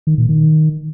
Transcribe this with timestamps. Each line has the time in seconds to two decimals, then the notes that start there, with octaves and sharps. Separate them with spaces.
0.07 D#3
0.18 A#2
0.29 D#3